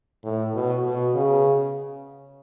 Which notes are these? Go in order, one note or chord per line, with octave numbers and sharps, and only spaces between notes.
A2
B2
B2
C#3